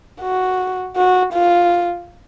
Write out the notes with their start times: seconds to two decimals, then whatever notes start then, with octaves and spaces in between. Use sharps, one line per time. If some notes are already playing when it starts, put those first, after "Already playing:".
0.22 F#4
0.97 F#4
1.33 F4